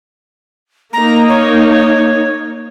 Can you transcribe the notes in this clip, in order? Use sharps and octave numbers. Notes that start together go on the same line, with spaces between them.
A#3 D#4 A#5
C#5